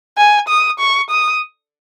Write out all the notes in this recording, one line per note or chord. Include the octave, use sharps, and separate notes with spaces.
G#5
D#6
C#6
D#6